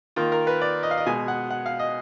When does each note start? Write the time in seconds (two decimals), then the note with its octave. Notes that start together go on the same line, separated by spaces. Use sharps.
0.16 D#3 A#3 F4
0.32 A#4
0.47 B4
0.62 D5
0.83 D#5
0.91 F5
0.97 D#5
1.07 B2 G#3 G#5
1.28 F#5
1.50 F#5
1.66 F5
1.79 D#5